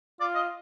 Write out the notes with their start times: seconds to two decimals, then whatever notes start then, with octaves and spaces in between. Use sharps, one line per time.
0.21 F4 D5
0.35 D#5